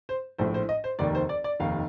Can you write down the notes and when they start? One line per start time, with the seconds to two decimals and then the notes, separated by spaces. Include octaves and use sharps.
0.09 C5
0.38 A#1 A2 C5
0.54 C5
0.69 D#5
0.84 C5
0.99 F1 D#2 D#3 D5
1.15 C5
1.29 D5
1.44 D5
1.60 F1 D#2 D#3 F5